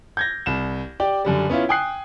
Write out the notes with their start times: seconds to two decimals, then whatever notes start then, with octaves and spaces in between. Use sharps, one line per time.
0.17 G6 G#6 A#6
0.46 C2 E7
1.00 G4 D5 G5
1.25 F#2 D3 G3
1.50 B3 C#4 E4 F4
1.69 G5 G#5 D#6 F#6 C7